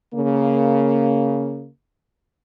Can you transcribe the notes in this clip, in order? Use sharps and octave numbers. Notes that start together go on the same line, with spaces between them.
C#3 A#3